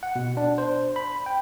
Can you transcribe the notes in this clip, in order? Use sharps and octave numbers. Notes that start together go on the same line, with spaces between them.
F#5
B2
D4
C5
B5
G5